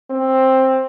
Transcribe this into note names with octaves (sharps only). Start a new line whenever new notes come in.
C4